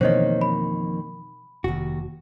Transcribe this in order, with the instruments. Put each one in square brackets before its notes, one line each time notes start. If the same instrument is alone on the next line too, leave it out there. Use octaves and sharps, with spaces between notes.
[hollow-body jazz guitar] F2 D#3 A#3 [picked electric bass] B2 E3 [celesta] C5 C#5 D#5
[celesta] B5
[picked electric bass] F1 [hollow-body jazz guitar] D#2 F#4